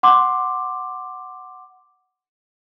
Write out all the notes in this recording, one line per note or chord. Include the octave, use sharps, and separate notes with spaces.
F#5 C6 D6